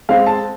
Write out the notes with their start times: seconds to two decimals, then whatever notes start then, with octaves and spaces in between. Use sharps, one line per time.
0.09 G#3 C4 F5
0.26 A5